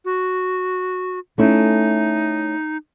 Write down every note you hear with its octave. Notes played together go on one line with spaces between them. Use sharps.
F#4
A3 C#4 D#4 E4